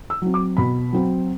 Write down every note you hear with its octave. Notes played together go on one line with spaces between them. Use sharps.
E6
F#3 C4
D6
B2 B5
F#3 C4